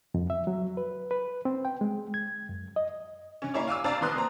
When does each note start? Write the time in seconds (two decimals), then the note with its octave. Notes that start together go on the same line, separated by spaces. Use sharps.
0.14 F2
0.30 E5
0.47 F#3
0.77 B4
1.11 B4
1.45 C4
1.65 G5
1.81 G#3
2.14 G#6
2.49 F#2
2.76 D#5
3.42 D3 C#4
3.54 A#3 E4 C#5 D5
3.68 F5 G#5 D6 E6
3.84 D4 C5 D5 F5 A5 A#5
4.01 A#1 D#3 B3 C6 D#6 F#6
4.15 A#3 C4 A#5